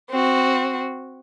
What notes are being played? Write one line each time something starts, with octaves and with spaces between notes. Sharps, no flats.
C4 F#4